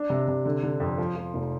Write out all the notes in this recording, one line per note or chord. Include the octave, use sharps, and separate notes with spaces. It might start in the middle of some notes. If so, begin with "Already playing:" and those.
Already playing: D4
C3
C3
D3
D3
F2
F3
F3
F1